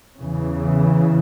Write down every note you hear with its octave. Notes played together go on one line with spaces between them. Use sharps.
E2 C#3 E3